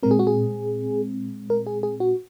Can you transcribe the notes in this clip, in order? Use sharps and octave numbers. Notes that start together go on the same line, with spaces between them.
A#2 G#3 C4 A#4
G#4
F#4
G#4
A#4
G#4
G#4
F#4